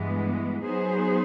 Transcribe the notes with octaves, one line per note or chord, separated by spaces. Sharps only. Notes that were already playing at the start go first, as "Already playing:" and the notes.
Already playing: G2 E3 G#3 B3
F#3 B3 D#4 G#4 C5